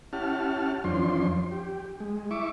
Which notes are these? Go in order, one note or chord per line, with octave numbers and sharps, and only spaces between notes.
C#4 E4 G4 F#5 A5 F6
F2 E3 F3 C#4 D4 C6
G4
G#3
E4 E5 C#6 D6